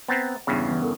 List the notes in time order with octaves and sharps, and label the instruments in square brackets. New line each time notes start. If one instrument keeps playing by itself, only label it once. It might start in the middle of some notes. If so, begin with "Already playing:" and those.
[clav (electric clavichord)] B3 C4 [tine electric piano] A#5 A6
[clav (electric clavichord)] E2 G2 C#3 [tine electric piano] B3
[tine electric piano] E3 B3
B3 A4 A#4